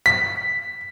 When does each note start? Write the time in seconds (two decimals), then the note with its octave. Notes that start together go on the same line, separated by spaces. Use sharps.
0.06 B6